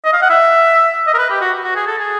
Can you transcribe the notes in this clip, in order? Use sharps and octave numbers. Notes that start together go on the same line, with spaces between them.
D#5
F5
F#5
E5
D#5
A#4
B4
G4
F#4
F#4
G#4
A4
G#4